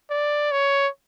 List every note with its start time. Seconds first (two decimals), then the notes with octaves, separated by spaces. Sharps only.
0.10 D5
0.51 C#5